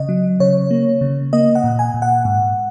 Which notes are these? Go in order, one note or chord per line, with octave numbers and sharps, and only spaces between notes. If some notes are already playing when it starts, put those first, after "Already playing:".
Already playing: C#3 D#5
F#3
C#3 C#5
A#3
C#3
A#3 D#5
F#5
A#2
G#5
A#2
F#5
G#2